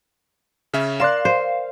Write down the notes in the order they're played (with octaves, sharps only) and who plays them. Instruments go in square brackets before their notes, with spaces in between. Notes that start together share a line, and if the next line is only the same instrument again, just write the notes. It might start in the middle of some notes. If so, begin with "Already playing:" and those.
[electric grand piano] C#3 C#4 E5
[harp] A#4 D5 F#6 [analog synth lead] F5 [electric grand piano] C6 E7
[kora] C5